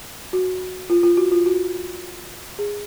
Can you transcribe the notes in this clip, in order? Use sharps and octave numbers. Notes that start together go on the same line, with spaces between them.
F#4
F4
F4
F#4
F4
F#4
G#4